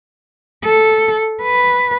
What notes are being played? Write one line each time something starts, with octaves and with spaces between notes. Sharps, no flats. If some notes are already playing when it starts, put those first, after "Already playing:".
A4
B4